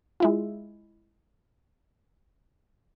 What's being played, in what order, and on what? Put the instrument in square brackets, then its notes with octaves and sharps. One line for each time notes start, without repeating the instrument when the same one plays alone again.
[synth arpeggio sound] G#3 E4 F4